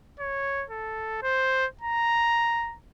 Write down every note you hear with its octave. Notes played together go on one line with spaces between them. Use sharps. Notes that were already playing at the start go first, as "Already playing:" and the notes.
C#5
A4
C5
A#5